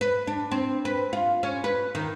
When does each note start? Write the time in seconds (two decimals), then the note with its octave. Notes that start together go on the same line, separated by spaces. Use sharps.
0.01 B4
0.27 D4
0.51 C4
0.85 B4
1.13 F4
1.43 C#4
1.64 B4
1.95 D#3